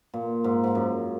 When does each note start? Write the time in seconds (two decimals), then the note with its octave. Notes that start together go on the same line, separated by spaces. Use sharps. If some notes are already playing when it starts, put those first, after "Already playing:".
0.14 A#2
0.44 G#2
0.64 G#2
0.75 F#2